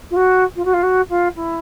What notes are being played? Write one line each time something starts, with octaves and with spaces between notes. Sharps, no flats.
F4
F#4
F4
F#4
F4
F#4
F4
E4